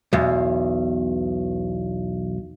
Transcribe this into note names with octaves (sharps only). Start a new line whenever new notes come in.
B1 E2